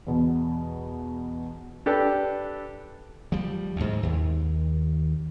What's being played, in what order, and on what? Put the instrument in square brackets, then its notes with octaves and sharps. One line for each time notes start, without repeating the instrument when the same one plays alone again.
[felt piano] E2 B2
[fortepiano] D4 G4 A4 B4
[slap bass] F3 G3
D2 G#2
D#2